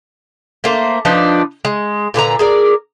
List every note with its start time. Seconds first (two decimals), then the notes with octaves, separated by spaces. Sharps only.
0.64 A3 A#3 C5
1.05 F3 D4 D#4 B4
1.65 G#3
2.14 A#2 D3 B4 A#5
2.39 G#4 A#4 D5